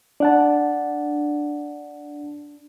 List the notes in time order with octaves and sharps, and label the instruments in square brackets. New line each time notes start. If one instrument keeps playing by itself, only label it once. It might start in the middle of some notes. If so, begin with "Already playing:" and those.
[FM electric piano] D4 [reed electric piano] D5 F#5 A5